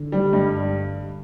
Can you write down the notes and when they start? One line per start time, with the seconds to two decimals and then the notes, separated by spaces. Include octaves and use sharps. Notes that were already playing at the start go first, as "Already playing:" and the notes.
Already playing: D3
0.12 G3
0.33 G2